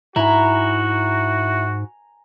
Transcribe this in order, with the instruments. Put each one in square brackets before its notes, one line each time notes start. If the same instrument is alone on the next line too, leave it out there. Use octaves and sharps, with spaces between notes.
[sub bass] G#2 [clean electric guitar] E4 [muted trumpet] F#4 [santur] G#5 A#5